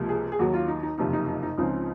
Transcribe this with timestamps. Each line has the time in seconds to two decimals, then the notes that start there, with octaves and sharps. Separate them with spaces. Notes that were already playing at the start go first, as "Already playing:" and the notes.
Already playing: C#2 C3 F3 A#3
0.09 G#4
0.32 G#4
0.39 D#2 D#3 F#3 F#4
0.54 F4
0.68 D#4
0.83 D#4
0.98 F#1 F2 C3 F3 D#4
1.13 D#4
1.29 D#4
1.43 D#4
1.58 C#2 C#3 F3 C4 D#4